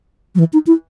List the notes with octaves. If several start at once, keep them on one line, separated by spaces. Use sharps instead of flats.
F#3
E3
D#4
E4